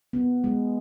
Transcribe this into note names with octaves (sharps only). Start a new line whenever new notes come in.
B3
G#3